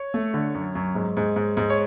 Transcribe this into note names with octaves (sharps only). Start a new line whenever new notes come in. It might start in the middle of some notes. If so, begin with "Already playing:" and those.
Already playing: C#5
A3
D3
F#2
F#2
G#2
G#2
G#2
G#2
C#5